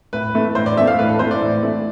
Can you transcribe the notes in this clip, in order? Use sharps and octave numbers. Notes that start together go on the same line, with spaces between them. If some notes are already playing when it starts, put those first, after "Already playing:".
A2 B4
E3 A3
A2 C5
D5
E3 A3 E5
F5
A2 B4
A4
E3 A3 C5
D5
A2
E3 A3